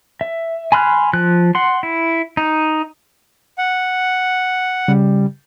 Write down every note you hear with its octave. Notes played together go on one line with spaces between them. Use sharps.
E5
G#5 B5 C6 F6 F#6
F3 F#6
F#5 C6
E4
D#4
F#5
C#3 G3